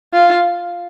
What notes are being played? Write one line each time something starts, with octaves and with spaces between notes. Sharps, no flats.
F4